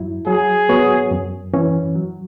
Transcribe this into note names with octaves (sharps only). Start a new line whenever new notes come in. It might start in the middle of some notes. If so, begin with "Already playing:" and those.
Already playing: F#2 F#3 E4
F#3 G#4
B3 F#4 C#5
F#2
E3 C#4
F#3